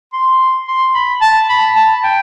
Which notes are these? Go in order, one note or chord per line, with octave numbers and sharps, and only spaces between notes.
C6
C6
B5
A5
B5
A5
G5